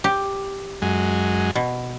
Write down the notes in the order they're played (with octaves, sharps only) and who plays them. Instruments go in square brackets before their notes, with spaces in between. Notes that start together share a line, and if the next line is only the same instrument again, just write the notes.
[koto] G4
[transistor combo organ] F#2 G#3
[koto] B2